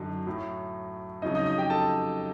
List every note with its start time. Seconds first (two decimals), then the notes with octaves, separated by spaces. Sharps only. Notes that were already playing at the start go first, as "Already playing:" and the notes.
Already playing: F#2 D3 F#3 D#4
0.27 A2 F#3
1.22 F2 C#3 F#3 D#4 D#5
1.35 D#4 D#5
1.46 D#4 D#5
1.58 G4 G5
1.70 A4 A5